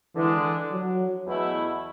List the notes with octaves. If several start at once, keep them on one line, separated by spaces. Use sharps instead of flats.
D3 E3 G#3 D4
F#3
E2 B2 A3 E4